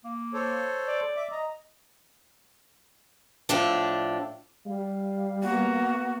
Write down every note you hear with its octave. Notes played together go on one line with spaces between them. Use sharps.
A#3
A4 C5 C#5
D5
E5 D6
D#5 A#5
A2 F3 D4 A4
G3 F5
A#3 B3 F#4